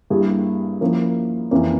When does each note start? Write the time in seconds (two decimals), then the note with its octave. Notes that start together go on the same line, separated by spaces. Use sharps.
0.10 G2 G3 A#3 E4 G#4
0.81 F3 A#3 C#4 E4 A#4
1.51 F2 E3 A#3 C#4